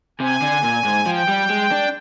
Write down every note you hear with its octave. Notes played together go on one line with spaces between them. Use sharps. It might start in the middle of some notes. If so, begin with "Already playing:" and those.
C3 G#5
D3
A#2
G#2
F3 G5
G3
G#3
D4